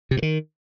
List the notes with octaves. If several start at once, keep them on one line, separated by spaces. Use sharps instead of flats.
C3
G2
D#3